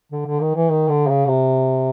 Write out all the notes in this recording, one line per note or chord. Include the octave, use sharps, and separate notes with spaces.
D3
D3
D#3
E3
D#3
D3
C#3
C3